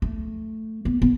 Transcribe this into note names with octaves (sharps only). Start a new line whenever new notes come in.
A3
B3
B3